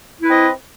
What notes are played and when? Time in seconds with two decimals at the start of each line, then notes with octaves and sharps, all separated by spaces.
0.21 E4
0.25 B4
0.28 C4
0.31 D#5